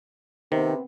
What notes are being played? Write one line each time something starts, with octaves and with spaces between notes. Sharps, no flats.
C3 D#3 B3 C4